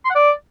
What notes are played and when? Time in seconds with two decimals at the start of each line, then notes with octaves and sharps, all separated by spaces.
0.05 C6
0.10 F#5
0.15 D5